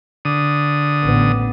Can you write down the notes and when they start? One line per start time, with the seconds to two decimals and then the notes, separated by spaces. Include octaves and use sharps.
0.25 D3 D#6
1.04 A1 B3